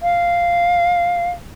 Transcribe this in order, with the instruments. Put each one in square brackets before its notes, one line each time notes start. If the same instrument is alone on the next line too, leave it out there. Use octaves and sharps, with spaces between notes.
[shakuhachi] F5